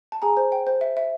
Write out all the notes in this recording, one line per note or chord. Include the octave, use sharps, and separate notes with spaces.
A5
G#4 G#5 A#5
C5
G5
C5
E5
E5